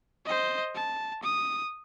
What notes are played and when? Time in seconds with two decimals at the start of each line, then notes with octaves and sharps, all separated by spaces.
0.25 C5 D#5
0.75 A5
1.23 D#6